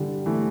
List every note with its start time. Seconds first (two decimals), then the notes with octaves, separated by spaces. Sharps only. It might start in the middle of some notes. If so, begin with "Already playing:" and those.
Already playing: D3 E3 G3
0.26 E3 A3